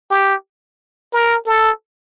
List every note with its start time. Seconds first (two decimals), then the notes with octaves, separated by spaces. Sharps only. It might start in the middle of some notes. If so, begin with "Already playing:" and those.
0.11 G4
1.13 A#4
1.46 A4